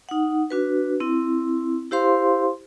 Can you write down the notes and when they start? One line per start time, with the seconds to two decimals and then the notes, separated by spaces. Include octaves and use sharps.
0.09 D#4 F#5
0.50 D4 F#4 B4
1.00 C4 E4
1.91 E4 G4 C5 F5 C6